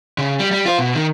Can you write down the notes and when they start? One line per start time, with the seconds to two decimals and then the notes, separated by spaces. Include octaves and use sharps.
0.18 C#3
0.39 G3
0.51 G3
0.66 F4 C5
0.79 B2
0.95 D#3